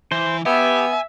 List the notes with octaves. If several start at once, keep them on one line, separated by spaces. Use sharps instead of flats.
E3 C5
B3 G4 E5 G#5